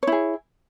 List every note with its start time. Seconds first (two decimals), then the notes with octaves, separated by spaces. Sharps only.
0.03 C#5
0.07 E4
0.12 G#4